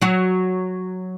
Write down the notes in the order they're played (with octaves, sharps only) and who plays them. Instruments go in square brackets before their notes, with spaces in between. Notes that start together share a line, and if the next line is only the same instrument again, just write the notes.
[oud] F#3 F#4